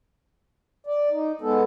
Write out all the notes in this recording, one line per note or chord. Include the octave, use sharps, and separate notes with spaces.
D5
D#4
G#3 B3 A4